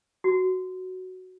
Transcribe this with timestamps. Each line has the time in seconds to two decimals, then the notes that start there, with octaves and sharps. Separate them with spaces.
0.24 F#4